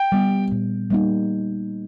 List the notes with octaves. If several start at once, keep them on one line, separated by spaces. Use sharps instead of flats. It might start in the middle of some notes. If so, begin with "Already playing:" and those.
Already playing: G5
G3 B3
A#2
G3 A#3 D#4